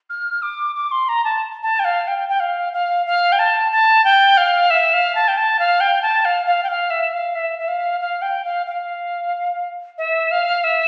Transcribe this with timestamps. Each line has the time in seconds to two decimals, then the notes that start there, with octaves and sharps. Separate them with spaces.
0.10 F6
0.42 D6
0.76 D6
0.91 C6
1.09 A#5
1.24 A5
1.63 A5
1.79 G5
1.85 F5
2.08 G5
2.29 G5
2.40 F5
2.73 F5
3.06 F5
3.32 G5
3.39 A5
3.72 A5
4.04 G5
4.37 F5
4.70 E5
4.93 F5
5.15 A5
5.28 G5
5.37 A5
5.59 F5
5.80 G5
6.02 A5
6.25 F5
6.46 F5
6.63 G5
6.68 F5
6.90 E5
7.13 F5
7.35 E5
7.59 E5
7.68 F5
8.00 F5
8.22 G5
8.45 F5
8.66 F5
9.98 E5
10.31 F5
10.64 E5